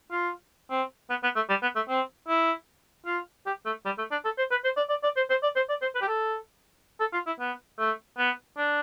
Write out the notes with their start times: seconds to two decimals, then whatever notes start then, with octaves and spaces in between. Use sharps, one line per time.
0.11 F4
0.70 C4
1.10 B3
1.23 B3
1.36 A3
1.50 G3
1.62 B3
1.75 A3
1.89 C4
2.28 E4
3.06 F4
3.46 G4
3.66 A3
3.85 G3
3.98 A3
4.11 D4
4.25 A4
4.38 C5
4.51 B4
4.64 C5
4.77 D5
4.89 D5
5.03 D5
5.17 C5
5.30 C5
5.43 D5
5.56 C5
5.69 D5
5.82 C5
5.95 B4
6.01 G4
6.08 A4
7.00 A4
7.13 F4
7.26 E4
7.39 B3
7.79 A3
8.18 B3
8.57 D4